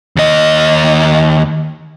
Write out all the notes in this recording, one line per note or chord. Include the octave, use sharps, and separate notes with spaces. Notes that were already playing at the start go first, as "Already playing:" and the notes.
D#2 D#5